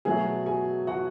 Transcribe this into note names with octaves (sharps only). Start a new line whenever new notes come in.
B2 F#3 A3 G#4 G#5
G#4 G#5
F#4 F#5